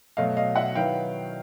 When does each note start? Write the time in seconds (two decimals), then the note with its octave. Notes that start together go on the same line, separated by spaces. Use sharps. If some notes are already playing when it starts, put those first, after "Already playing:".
0.17 B2 F#3 A3 D#5 F5
0.37 D#5 F5
0.56 E5 F#5
0.75 D#3 F#3 B3 E4 F5 G5